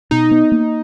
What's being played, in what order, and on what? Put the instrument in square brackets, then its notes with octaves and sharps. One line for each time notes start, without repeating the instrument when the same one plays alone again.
[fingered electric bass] B2 [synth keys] D#4
[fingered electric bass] B3
A#3